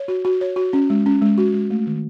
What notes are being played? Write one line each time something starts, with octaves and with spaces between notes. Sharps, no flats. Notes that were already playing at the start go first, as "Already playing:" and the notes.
Already playing: C#5
F#4
F#4
C#5
F#4
C#4
G#3
C#4
G#3
F#4
G#3
A3
D#3